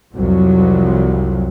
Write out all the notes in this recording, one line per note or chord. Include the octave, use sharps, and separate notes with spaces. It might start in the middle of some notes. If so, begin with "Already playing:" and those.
C2 F2 F#3